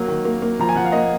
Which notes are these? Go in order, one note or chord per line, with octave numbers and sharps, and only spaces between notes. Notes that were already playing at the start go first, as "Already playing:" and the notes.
Already playing: F#3 A#3
D#3
A#3
A#3
F3 A#5
G#5
F3 F#5
F5
A#3 D#5